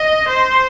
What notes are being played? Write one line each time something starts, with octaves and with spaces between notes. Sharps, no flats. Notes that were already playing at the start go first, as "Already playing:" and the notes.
Already playing: D#5
C5